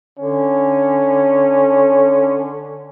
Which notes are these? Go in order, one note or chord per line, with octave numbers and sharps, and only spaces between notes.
D3 C#4